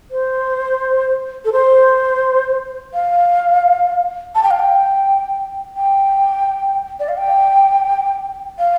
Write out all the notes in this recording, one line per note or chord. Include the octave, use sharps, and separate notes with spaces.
C5
A4
C5
F5
A5
G5
F5
G5
G5
D5
F5
G5
F5